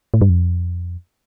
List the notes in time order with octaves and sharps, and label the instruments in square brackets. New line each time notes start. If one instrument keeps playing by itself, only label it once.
[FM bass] A2
G2
F2